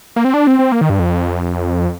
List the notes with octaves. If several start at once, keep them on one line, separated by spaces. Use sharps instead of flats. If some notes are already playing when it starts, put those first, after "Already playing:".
A#3
C4
D4
C4
C4
A#3
D#3
G2
F2